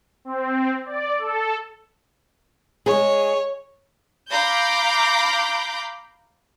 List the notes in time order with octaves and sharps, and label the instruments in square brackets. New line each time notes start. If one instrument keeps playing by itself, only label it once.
[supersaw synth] C4
D5
A4
[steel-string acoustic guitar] G#3 G#4 [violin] C#5
[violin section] F5 A#5 B5 D6 G6